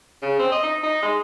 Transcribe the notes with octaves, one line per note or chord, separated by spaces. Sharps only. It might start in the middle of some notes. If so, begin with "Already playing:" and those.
C#3
C4
D#5
D#4
D#4
G#3